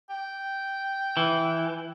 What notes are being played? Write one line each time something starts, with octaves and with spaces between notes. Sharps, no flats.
G5
E3